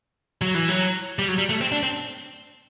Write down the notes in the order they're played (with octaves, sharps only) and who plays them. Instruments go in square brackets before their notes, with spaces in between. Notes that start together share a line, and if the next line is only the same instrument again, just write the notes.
[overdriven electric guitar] F#3
E3
F#3
G3
F#3
G3
A3
C4
D4
C4